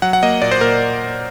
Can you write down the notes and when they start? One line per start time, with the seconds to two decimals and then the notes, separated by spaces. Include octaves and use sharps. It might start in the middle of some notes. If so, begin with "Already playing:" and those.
0.02 F#3 F#5
0.13 F#5
0.23 A#3 D#5
0.42 A#2 D5
0.52 C5
0.61 A#2 A#4